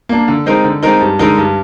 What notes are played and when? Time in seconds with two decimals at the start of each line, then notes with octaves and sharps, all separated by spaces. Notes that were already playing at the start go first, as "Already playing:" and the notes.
0.09 A#3 D4
0.28 D3
0.46 G#3 C4 D#4 A#4
0.64 D3
0.83 G#3 C4 D#4 A#4
1.01 G2
1.19 D3 G#3 D#4 A#4
1.38 G2